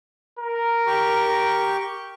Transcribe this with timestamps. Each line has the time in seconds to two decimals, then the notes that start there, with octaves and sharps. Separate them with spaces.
0.39 A#4
0.87 G4 C#6